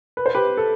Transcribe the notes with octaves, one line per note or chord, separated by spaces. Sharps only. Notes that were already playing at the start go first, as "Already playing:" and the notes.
B4
C5
G4 B4
A4